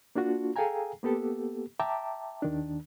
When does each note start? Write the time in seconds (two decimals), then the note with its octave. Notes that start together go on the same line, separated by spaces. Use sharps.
0.15 A#3 D4 F4 F#4
0.56 G#4 A4 F5 G5 G#5 A#5
1.03 A#3 B3 G4 A4
1.80 E5 G5 A5 A#5 D6
2.42 D#2 D#3 D4